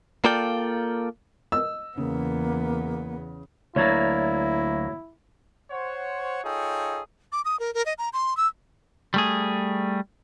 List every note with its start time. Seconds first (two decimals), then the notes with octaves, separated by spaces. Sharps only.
0.24 A#3 F4 A4 D5 G5
1.52 D#5 E6
1.97 E2 C#3 A#3 B3
3.76 D2 F#3 A#3 E4 C#5 G#6 A6
5.70 C5 C#5 F#5
6.44 D#4 F4 G#4 A4 C#5 G5
7.32 D6
7.45 D#6
7.59 A#4
7.74 A#4
7.86 D#5
7.98 A#5
8.13 C6
8.37 E6
9.14 G3 A3 G#4